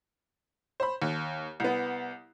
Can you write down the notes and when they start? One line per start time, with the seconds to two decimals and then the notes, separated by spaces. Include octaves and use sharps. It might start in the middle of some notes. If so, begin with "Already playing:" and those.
0.80 C5 B5
1.02 D#2
1.60 C2 B3